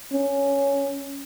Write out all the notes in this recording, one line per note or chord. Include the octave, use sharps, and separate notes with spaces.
C#4